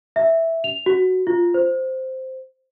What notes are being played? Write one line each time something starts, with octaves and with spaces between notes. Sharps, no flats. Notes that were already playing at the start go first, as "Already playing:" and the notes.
E5
F7
F#4
F4
C5